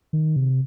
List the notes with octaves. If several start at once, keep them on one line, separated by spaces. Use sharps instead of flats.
D#3
C3